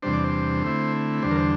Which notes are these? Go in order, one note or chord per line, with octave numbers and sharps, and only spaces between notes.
E2 C3 G3 D4 C5
D5
C5
D3 A3 C4 E4
E2 D3 G3 D4 C5
A#4
C5